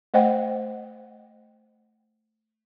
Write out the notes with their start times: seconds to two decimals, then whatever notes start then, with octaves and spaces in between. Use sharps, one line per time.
0.14 A3 C5 D#5 F#5 G5